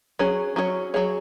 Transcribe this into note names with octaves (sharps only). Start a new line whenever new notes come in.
F#3 C#4 G#4 C#5
F#3 C#4 G#4 C#5
F#3 C#4 G#4 C#5